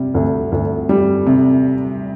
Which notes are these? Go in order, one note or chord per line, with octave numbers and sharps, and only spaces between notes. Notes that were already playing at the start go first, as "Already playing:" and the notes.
Already playing: C3 G3
D2
D2
G3
C3